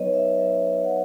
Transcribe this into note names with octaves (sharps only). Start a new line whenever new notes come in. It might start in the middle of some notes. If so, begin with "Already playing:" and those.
Already playing: F#3 B3 D#4 B4 C#5 D#5
E5
F#3 E5
E5
F#3 F#5